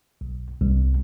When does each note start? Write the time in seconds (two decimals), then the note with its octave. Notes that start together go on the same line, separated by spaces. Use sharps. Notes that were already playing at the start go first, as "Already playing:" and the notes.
0.21 B1
0.61 C2